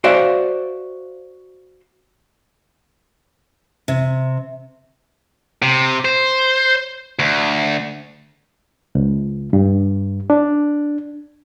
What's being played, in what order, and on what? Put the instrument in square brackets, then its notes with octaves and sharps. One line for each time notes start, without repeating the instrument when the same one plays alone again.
[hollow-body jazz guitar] F#4 C5 D5 E5 F5
[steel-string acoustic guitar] C3
[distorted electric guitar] C3
C5
D2
[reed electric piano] C#2
G2
D4